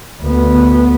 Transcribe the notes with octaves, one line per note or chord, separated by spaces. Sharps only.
D2 B3